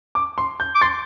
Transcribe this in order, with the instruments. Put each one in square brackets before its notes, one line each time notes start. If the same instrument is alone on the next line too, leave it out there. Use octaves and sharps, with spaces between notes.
[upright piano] D6
C6
G6
[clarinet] D6
[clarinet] C6 [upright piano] A6